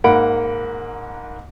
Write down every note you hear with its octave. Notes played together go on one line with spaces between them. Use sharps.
G#2 A#3 F#5 B5 D7